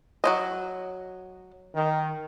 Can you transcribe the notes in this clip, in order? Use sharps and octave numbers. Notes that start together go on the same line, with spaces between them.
F#3 C4 D#5
D#3